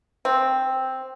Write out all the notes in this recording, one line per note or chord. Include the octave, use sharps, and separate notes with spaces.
C4